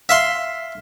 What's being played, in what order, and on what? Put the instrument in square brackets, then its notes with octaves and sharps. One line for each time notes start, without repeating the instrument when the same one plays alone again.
[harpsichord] E5 F5 C6